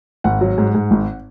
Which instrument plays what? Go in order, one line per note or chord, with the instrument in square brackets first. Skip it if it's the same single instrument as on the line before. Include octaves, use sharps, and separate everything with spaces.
[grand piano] G#1 F#5
F#3
G#2
G#2
G#1